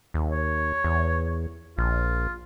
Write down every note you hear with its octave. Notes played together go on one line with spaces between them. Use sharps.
D#2
C#5
E2
A#1 F4